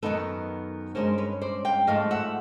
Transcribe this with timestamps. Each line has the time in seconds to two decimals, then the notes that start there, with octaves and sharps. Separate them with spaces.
0.03 F#2 D#3 G#3 B3 D#4 A4 B4
0.95 G2 E3 G#3 C#4 A#4 C5
1.18 B4 C#5
1.41 C5 D5
1.65 F5 G5
1.87 G#2 F3 A3 D#5 F5
2.11 E5 F#5